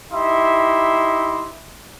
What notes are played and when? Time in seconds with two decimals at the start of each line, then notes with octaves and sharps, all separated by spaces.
0.12 D#4 E4 G4 E5 C6